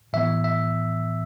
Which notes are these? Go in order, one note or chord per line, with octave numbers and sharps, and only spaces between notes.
A2 E3 B3 E5
E5